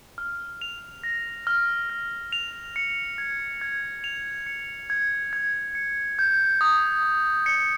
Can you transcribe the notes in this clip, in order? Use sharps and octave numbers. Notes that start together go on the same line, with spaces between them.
F6
F7
A#6
F6
F6
F7
C#7
G#6
G#6
F7
C#7
G#6
G#6
C#7
G6
D#6
D#6
C#7